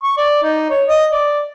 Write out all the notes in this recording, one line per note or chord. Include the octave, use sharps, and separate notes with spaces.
C#6
D5
D#4
C#5
D#5
D5